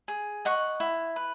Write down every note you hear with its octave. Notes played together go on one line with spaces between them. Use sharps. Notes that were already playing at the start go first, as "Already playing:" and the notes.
G#4
D#5 F#5 C#6
E4
B4